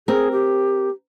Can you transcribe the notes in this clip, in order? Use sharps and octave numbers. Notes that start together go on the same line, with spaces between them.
C4 G#4 A#4
G4